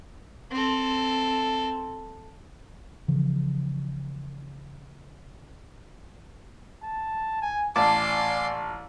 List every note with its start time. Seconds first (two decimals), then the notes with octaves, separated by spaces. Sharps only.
0.51 C4 A4
3.08 C#3 E3 F3
6.82 A5
7.42 G#5
7.76 A1 D5 G#5 A5 C6 D6